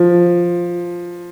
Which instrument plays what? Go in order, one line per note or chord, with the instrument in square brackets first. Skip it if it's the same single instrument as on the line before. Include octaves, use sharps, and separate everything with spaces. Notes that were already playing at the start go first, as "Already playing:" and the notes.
Already playing: [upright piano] F3